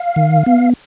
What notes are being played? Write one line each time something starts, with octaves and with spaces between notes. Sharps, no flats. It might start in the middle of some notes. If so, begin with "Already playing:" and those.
Already playing: F5
D#3
B3